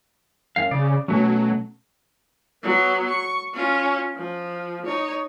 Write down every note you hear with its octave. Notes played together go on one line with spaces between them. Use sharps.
F#2 F5
C#3 D5
B2 F#3 A3 C#4
F#3 B3
C#6
C#4 F4
F3
D#4 C#5